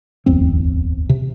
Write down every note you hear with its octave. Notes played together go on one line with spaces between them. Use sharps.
D1 G1 E2 C4
C3